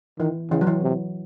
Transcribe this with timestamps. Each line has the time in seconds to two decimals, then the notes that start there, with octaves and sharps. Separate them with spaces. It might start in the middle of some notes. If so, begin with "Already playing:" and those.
0.19 D#3 E3
0.51 C#3 E3
0.61 F#3
0.67 E3
0.83 C3